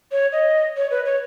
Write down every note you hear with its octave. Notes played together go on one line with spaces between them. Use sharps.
C#5
D#5
C#5
B4
C#5